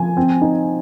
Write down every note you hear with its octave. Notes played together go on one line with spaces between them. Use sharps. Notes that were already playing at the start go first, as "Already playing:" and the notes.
Already playing: F3 G#5
C4
D#4